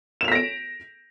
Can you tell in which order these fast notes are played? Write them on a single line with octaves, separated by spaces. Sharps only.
E7 F7 B6 A#6 D7